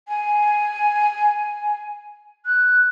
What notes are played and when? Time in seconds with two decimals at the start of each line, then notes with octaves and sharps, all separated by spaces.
0.08 G#5
2.45 F#6